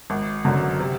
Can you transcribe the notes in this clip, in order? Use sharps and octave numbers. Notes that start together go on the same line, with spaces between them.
G#1
F#2 D3 F#3
C3